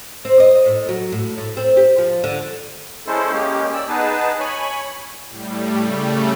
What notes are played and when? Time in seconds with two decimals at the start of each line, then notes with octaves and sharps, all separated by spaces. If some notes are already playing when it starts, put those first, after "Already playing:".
0.25 C4
0.40 D#5
0.66 A2
0.89 F#3
1.12 A2
1.38 A2
1.57 C4
1.77 G4
1.98 F3
2.24 D3
3.07 G#3 C#4 E4 A4 C5
3.32 G#3 A#3 C#4 G4
3.73 D5 E6
3.88 B3 D#4 G#4 B4 A5
4.40 C#5 G#5 B5
5.29 A2 G3
5.78 C#3 G3 A3